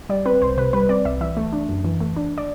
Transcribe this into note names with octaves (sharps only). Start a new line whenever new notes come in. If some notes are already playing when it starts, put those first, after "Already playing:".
G3 D5
C4 B4
C2 C5
C3 B4
G3 B4
C4 D5
C2 E5
E3 E5
A3
D4
F#2
E3
A3
D4
D5